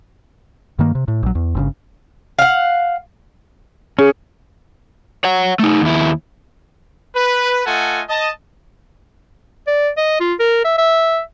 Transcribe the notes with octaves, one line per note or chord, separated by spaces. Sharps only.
G2 D#3 A#3
C3
A2
A#1 F#3
E2
G1 A#2 C#3
F5 F#5
C#4 G#4
C#5 F#5
A3 D#4
D#2 E4
B4
A3 F4 A4 D#5 F#5 G#5
D#5 A5
D5
D#5
F4
A#4
E5
E5